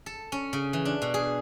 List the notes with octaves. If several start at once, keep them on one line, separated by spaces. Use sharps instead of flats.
A4
C#4
C#3
E3
D4
B2
G#4